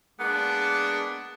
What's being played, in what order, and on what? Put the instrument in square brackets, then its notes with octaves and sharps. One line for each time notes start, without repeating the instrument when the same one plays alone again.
[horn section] G#3 A#3 B3 D4